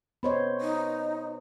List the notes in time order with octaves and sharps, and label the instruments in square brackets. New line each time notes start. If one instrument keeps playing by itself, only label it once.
[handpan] B3 C5 C#5 [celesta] D#5 B5
[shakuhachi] D#4